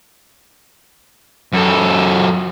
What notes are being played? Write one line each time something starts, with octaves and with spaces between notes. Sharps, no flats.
F#2 A4